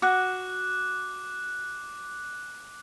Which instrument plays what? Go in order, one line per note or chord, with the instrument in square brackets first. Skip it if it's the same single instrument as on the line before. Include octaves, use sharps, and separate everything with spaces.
[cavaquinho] F#4 [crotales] D6 F#6